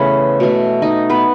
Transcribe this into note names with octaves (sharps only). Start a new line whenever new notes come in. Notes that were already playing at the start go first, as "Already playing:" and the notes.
Already playing: C#3 E3 A3 B3 C#4 A4 B4 C#5
B2 A3
D#4 D#5
B3 B4